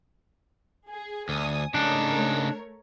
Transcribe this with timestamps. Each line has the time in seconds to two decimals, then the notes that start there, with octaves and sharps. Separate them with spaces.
0.89 G#4
1.29 D2 G#5 D#6
1.74 C#3 A3 D4 D#4 A#4 C#5